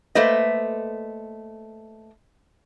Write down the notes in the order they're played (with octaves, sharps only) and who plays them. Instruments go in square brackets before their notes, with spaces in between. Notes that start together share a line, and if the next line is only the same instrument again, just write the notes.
[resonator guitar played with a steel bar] A3 A#3 B4 C5 D#5